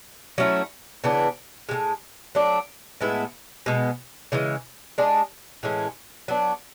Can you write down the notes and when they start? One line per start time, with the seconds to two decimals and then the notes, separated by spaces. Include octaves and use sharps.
0.38 F#3 A3 C#4 E4
1.04 C#3 E3 B3 D4
1.69 A2 E3 G#3
2.35 F#3 A3 D4
3.01 A2 G#3 B3 E4
3.66 B2 G#3 B3
4.32 C#3 E3 G#3
4.98 G#3 D4 G#4
5.63 A2 E3 G#3 C#4
6.28 F#3 B3 D4